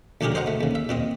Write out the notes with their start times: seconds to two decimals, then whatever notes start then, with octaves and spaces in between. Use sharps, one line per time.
0.21 D2 F#3 D4 G4 G#4 A#4
0.35 C5 D#5 F#5 A#5
0.47 A3
0.61 D#2 C#3
0.75 E5
0.89 A#2 C4 D#5